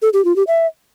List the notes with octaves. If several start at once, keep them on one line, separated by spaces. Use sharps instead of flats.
A4
G4
F4
G4
E5